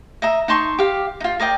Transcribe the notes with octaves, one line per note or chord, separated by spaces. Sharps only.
D#5 E5 A#5
D#4 A5 C6 C#6
G4 F5
D#4 F4
A#4 D5 D#5 G5